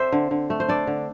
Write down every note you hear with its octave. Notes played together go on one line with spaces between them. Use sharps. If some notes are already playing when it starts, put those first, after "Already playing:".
Already playing: C4 A4 C5 D5 E5
D3
D3
A3
C5
D4 A4 D5
D3